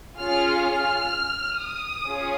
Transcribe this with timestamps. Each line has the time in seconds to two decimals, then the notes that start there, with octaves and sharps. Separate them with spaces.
0.18 C#4 F4 G#4 F6
0.65 F6
1.60 D#6
2.07 C#4 F4 G#4